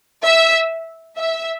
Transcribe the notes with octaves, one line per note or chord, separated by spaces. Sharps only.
E5
E5